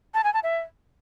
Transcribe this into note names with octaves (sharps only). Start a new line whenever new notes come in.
A5
G#5
A5
E5